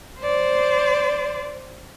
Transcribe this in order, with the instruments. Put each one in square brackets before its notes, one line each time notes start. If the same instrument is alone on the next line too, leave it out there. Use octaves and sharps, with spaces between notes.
[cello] C5 D5